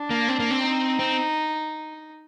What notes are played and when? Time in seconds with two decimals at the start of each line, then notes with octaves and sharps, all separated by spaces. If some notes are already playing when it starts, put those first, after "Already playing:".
Already playing: D4
0.10 A#3
0.28 C4
0.40 A#3
0.51 C4
0.64 D#4
0.99 C4